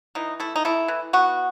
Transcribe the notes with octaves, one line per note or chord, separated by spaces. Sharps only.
E3 D#4
A3 E4
D#4
A3 E4
E3
B3 F#4